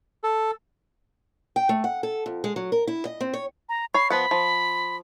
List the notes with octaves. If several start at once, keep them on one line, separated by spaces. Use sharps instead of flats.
A4
G5
A3
F#5
A4
F2
G#3
F#3
A#4
E4
D#5
C4
C#5
A#5
C#5 B5 C7
F3 B3 F#5 B5
F3